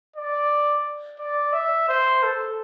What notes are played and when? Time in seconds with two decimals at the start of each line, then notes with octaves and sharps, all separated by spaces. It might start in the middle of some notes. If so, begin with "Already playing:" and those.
0.16 D5
1.19 D5
1.53 E5
1.88 C5
2.23 A4